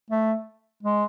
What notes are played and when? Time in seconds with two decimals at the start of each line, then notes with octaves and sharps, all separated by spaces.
0.10 A3
0.83 G#3